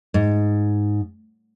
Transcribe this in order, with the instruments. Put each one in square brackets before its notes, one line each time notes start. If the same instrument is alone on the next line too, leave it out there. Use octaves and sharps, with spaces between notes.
[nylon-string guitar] G#2